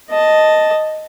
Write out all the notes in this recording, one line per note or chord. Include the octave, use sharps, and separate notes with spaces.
D#5 A5